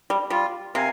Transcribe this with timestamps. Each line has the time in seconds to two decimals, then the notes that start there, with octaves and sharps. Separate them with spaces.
0.10 G3
0.30 G3 F4
0.75 C3 A#4 F5 G#5